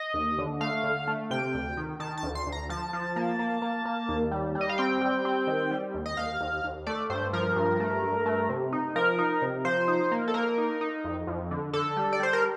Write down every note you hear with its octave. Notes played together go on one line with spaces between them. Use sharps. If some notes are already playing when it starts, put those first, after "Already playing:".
Already playing: D#5
D#2
D3
A3 F5
D3
A3
C3 G5
D2
D#3
D#3 A5
A5
D2
C6
D2
A#5
F3 A5
F3
A#3
A#3
A#3
A#3
D#2
G3
G3
D#5
F5
C4 G5
G3
C4
D#3
G3
D#2
D#5
D#2 F5
D#2
D#2
A3 D5
G2 C5
F3 A#4
G2
A3
G2
A3
C3
D#4
F3 A#4
D#4
C3
F3 C5
D#4
A#3
A4
A#3 A#4
D#4
D#4
F2
F2
D3
D3 A4
G3
D5
G3 C5
A#4